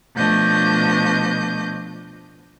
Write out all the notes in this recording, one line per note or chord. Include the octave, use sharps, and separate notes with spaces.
B2 F3 A3 D4 D#5 G6